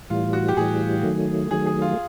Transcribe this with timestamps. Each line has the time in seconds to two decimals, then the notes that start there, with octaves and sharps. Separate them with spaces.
0.10 A2 E3 G3 F4
0.33 F#4
0.48 G4
0.57 A2 E3 G3 G#4
1.03 D#3 F#3 A3
1.51 D#3 F#3 A3 G#4
1.66 G#4
1.82 F4